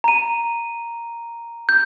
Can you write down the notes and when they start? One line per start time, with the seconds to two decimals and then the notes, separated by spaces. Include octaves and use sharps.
0.04 A#5 D#7
1.69 G6